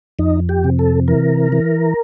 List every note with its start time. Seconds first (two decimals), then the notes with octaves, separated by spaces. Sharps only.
0.19 F2 D#4
0.49 G4
0.64 C3
0.79 A4
1.08 E3 A#4
1.52 E3